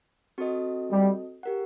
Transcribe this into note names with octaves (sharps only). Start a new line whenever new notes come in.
C4 F#4 A4 D#5
G3
G4 A#4 F#5